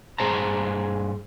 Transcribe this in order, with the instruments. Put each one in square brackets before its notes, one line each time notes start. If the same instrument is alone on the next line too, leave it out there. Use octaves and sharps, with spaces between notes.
[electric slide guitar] G2 G#4 C5 A5 A#5